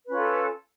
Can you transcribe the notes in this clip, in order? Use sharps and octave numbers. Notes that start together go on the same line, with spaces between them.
C#4 F4 A4 B4